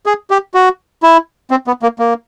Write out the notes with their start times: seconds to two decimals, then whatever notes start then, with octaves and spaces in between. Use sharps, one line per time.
0.06 G#4
0.31 G4
0.54 F#4
1.03 E4
1.51 C4
1.67 B3
1.82 A#3
1.99 A#3